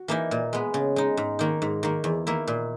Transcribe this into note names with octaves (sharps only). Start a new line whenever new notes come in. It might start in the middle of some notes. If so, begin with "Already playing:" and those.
Already playing: F#4
E3 A#3 D#4
A#2
G#3 B3
C#3
G#3 D#4
G#2
D#3 A#3 D#4
G#2
D#3 A#3
E2
D#3 A#3 E4
A#2